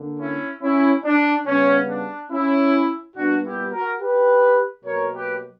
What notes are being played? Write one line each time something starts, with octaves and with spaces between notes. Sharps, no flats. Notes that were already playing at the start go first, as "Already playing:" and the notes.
Already playing: D3 A#3
C#4 E4
C#4 E4
D4
C#3 G3 B3 C#4
D4
C#4 E4
A#2 G3 B3 D4 F#4
E4 G4
F#4 A#4
G4 B4
B2 F#3 A#3 A#4 C#5
G4 B4